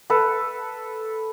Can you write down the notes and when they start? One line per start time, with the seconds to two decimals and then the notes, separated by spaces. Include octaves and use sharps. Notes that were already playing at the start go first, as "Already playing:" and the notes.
0.10 A4 B4